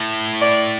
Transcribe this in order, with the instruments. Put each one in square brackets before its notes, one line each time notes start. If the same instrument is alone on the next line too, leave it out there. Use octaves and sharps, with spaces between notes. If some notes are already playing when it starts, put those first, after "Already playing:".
Already playing: [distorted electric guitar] A2
[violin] D5